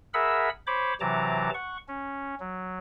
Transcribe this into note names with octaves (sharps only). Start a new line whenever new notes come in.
G#4 A#4 E5 F#5 B5 E6
C5 C#5 B5 D6
C3 E3 F#3 A5 A#5 D6
F#5 C#6
C#4
F#3